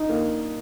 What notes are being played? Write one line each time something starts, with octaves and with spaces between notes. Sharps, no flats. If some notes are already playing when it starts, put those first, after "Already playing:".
Already playing: D#4
A#3